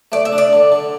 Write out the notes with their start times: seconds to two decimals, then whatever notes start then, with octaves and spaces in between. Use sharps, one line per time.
0.12 A3 D5
0.25 E5
0.32 D4
0.38 D5
0.53 D3
0.72 D3